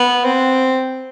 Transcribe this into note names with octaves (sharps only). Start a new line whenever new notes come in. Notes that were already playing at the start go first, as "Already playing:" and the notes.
Already playing: B3
C4